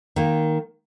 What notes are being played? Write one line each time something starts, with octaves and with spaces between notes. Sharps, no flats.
D#3 A#3